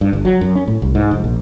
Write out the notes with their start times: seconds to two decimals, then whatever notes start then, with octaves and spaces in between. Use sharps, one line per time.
0.01 G2
0.13 G1
0.25 F#3
0.41 F#2
0.55 C#4
0.68 A2
0.82 C2
0.95 G#2
1.11 F1
1.24 A#1